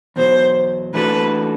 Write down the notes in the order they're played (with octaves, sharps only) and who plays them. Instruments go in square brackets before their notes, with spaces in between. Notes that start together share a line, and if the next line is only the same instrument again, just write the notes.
[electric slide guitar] E2 B2 F#3 [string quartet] C5
[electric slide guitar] E3 A3 D4 F#4 A4 [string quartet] B4